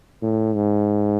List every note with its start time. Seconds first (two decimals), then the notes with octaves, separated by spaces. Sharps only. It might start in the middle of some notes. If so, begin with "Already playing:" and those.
0.22 A2
0.55 G#2